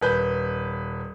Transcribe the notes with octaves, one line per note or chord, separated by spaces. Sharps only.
D#1 B4 G6